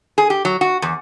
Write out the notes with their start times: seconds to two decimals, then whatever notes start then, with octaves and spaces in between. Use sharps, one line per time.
0.18 G#4
0.30 G4
0.45 F#3
0.61 F#4
0.82 E2